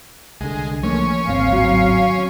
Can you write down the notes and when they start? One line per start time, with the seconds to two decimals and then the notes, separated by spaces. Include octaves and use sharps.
0.41 C2 D3 G#3
0.83 F3 A3 A#3 C#4
1.26 D1 G#1 C4 F5
1.52 F#3